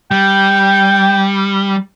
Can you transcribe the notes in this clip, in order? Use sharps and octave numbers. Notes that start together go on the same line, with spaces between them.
G3 G5